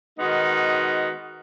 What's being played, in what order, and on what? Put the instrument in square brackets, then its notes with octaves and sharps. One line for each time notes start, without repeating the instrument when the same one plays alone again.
[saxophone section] D#3 G#3 B3 D#4 F#4